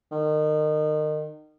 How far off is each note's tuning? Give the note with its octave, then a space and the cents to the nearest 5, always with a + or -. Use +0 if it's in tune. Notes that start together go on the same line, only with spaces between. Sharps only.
D#3 -30